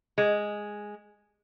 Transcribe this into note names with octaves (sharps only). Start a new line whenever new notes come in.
G#3